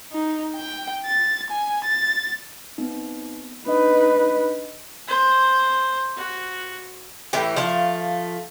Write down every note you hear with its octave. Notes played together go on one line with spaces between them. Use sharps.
D#4
G5
A6
G#5
A6
B3 C4 D#4
D4 D#4 B4 D#5
C5
F#4
A2 E3 G4
F3 A3 F5